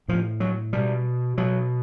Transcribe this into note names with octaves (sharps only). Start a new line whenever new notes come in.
A2 F3
F#3
B2 G3
B2 F#3